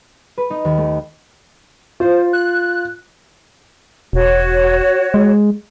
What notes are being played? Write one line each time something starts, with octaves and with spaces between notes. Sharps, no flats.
B4
D#4
D#2
A3
F4 C5
F#6
E1 F#4 C#5
G#3